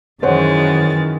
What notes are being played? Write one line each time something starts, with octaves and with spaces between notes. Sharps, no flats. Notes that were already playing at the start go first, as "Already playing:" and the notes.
F#2 D#3 E3 G#3 C5 C#5 F#5 A6